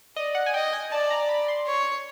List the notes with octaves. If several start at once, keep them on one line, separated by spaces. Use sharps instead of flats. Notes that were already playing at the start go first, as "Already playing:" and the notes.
D5 D#5
F#5
G#5
D#5 G5
G#5
D5 A5
A#5
B5
C6
C#5